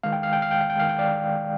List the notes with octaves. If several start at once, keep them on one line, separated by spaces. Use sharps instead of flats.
D#3 G#3 F5
G5
F5
G5
F5
G5
F5
G5
D#3 G#3 F5
G5
D5 F5